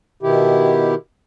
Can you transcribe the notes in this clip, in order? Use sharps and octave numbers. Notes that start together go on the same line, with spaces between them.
B2 D#3 E4 G4